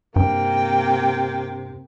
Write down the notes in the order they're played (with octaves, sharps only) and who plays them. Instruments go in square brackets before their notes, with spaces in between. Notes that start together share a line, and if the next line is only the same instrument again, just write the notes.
[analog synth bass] G2 [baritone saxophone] C3 [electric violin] A#3 G5